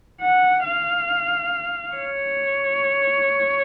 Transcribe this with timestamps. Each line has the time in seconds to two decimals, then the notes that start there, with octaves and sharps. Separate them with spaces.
0.21 F#5
0.64 F5
1.95 C#5